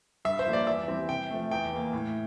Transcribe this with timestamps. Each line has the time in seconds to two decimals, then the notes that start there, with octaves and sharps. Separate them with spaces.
0.25 G2 E5
0.39 C5
0.46 F3 A#3
0.53 D5
0.67 E2 E5
0.88 E3 G3 C4
1.09 C3 G5
1.31 F3 A3
1.51 E2 G5
1.72 E3 A#3
1.93 A2